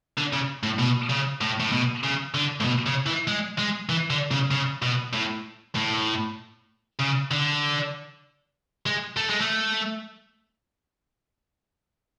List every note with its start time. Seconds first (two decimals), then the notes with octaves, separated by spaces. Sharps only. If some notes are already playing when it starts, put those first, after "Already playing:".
0.18 D3
0.33 C#3
0.63 A2
0.79 B2
1.10 C#3
1.41 A2
1.60 A2
1.72 B2
2.03 C#3
2.34 D3
2.61 A2
2.65 B2
2.87 C#3
3.07 E3
3.28 G#3
3.58 G#3
3.89 E3
4.10 D3
4.31 C#3
4.51 C#3
4.82 B2
5.13 A2
5.76 A2
7.00 C#3
7.31 D3
8.86 G#3
9.17 A3
9.30 G#3
9.41 A3